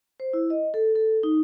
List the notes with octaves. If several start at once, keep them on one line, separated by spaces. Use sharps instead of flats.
C5
E4
D#5
A4
A4
D#4